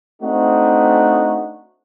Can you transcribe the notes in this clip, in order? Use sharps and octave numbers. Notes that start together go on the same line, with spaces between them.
A3 C4 D4 D#4 F#4